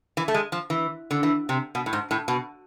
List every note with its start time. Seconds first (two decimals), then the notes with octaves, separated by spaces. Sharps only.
0.17 E3
0.28 A3
0.34 G#3
0.52 F3
0.70 E3
1.11 D3
1.23 E3
1.49 C3
1.75 B2
1.86 A2
1.93 G#2
2.11 A2
2.28 B2